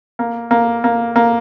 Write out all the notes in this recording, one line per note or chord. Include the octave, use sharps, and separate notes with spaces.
A#3
A#3
A#3
A#3